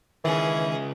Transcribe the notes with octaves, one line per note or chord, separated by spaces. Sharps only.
C#2 D#3 E3 C#4 G#4